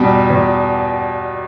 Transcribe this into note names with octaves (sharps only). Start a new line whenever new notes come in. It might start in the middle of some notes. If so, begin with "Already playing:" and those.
Already playing: E2 B2 G3
E2